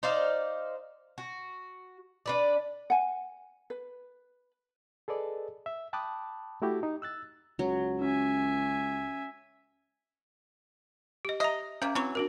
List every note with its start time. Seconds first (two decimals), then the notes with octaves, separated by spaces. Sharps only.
0.03 D#4 C5 D5 F5
1.18 F#4
2.26 D4 B4 D5
2.90 F#5 G#5
3.70 B4
5.08 G#4 A4 B4 D5 D#5
5.66 E5
5.93 G5 A5 B5 D6 D#6 F#6
6.62 A3 E4 F#4 G4
6.83 D#4
7.02 E6 F#6 A6
7.59 C#2 F#3
8.01 C#4 E5 G#5
11.25 G4 D#5
11.40 D#5 E5 A#5
11.82 C3 A#3 C#4
11.95 E3 F#3 C4 C#6
12.15 D4 F#4 A#4